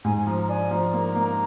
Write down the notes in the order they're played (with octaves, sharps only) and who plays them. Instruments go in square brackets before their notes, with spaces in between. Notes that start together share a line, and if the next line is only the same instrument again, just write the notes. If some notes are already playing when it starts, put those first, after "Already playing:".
[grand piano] G#2 [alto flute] G#5
[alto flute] G#5
[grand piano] F3 [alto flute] A#5
[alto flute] A#5
[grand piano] D4 [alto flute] G#5
[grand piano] F3 [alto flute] A#5
[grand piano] A#3
A#3